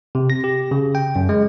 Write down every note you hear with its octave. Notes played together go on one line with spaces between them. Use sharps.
C3
A#6
G4
C#3
G5
F#2
G#3